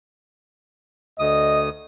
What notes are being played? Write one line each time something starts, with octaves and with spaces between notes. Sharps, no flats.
D2 D#5 D#6